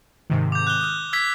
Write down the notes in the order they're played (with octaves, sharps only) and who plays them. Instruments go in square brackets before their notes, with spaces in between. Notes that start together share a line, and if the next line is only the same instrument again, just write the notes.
[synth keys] G#2 C3 D#3
[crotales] D6 G6
F#6 G7
[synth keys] D#6 F6
[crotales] E6 G#6 B6